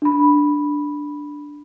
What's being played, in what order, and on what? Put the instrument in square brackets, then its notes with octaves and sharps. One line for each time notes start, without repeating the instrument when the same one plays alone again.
[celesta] D4 B5